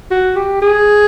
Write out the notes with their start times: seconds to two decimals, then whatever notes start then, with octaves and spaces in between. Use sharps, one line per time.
0.11 F#4
0.36 G4
0.62 G#4